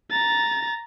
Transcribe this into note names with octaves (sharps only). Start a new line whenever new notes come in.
A#5 A6